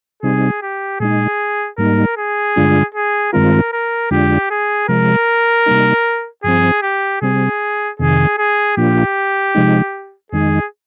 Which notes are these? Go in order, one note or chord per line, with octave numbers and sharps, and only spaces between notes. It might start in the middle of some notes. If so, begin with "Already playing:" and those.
C3 G3 C4 D#4 G#4
G4
A#2 G#3 D#4 G#4
G#2 G3 A#3 D#4 A#4
G#4
G2 D3 G#3 D4 F4
G#4
G2 D#3 G#3 C4 F4 A#4
A#4
F2 D3 G#3 D4 F4 G4
G#4
C3 F3 G#3 A#4
C3 G3 A#3 D#4
G2 F3 C4 G#4
G4
C3 G3 C4 G#4
F2 C3 D#3 G#4
G#4
A#2 F3 A#3 D4 F4 G4
C3 F3 G#3 D#4
F2 D#3 G#3 D#4 G#4